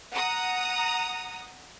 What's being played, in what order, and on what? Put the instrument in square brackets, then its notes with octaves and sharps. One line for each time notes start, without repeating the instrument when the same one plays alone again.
[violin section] F#5 A#5 D#6